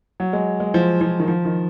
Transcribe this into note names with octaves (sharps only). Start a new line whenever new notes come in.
F#3
G#3
G#3
F3
F3
D#3
F3
D#3